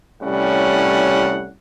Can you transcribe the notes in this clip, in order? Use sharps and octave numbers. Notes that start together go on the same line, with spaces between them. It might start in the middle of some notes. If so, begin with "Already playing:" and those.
C2 A2 G3 C#4 F#5